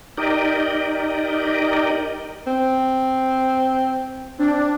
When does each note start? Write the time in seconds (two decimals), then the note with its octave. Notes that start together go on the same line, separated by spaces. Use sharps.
0.18 D#4 G4 A#4 D5 D#5
2.47 C4
4.39 C4 D4